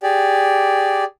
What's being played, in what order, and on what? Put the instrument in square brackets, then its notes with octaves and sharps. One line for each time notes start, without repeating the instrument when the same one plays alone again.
[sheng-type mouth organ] G4 G#4 D5